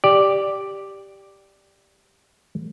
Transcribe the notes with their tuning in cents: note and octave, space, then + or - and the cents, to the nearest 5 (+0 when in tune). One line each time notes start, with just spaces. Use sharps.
G4 +0 D5 +0